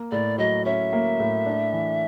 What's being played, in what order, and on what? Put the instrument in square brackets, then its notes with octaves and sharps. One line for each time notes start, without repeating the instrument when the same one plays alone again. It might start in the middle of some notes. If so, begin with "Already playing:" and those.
Already playing: [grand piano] A#3
[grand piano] A2 [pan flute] D5
[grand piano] F#3 [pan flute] D#5
[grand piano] C#4 [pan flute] E5
[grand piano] A#3
A2
D4
E3